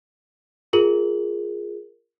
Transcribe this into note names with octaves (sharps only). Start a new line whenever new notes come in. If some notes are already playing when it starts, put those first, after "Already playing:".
F4 G#4 A#4 F#7